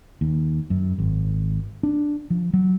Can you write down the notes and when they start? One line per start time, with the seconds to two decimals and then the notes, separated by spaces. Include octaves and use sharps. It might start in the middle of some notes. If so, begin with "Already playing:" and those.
0.21 D#2
0.70 F#2
0.98 G#1
1.83 D4
2.30 F3
2.54 F#3